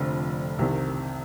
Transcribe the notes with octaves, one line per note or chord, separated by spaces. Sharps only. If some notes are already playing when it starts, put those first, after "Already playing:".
Already playing: F1 F2 D3
C2 C3 D#3